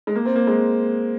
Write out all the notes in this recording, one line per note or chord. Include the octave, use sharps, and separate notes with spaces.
G#3
A#3
C4
A#3
G#3